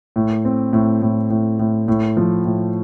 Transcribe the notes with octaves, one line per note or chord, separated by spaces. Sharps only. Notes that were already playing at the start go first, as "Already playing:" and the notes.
A2
C4
A2
A2
A2
A2
A2
F3
A2